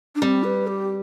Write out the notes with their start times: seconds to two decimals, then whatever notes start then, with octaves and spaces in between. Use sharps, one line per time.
0.15 D4
0.22 G3 C4
0.44 B4
0.67 G4